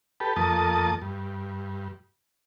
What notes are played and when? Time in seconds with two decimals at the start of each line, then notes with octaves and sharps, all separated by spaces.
0.20 G4 A4 B4
0.36 F2 A#3 A4 A5 D#6
1.02 G2